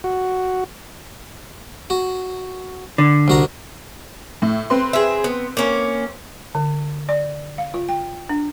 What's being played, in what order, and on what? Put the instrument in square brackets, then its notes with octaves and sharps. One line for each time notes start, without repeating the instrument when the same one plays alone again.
[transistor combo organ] F#4
[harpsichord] F#4
[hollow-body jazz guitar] D3
[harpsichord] C2 F#4 A#5
[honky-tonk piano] A2
C4 B4 C6
[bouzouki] G#4 E5
B3
A#3 C#4
[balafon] D3
D5
F5
F4
G5
D4